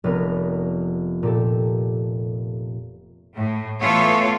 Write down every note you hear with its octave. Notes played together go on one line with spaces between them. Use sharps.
F1 B3 A#4
A#2 G4 A4
A2
E3 A3 B3 F4 A4 C#5